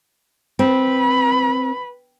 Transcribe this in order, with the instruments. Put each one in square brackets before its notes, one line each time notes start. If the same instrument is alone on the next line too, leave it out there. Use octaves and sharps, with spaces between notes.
[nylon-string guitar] C4 [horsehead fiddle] B4 B5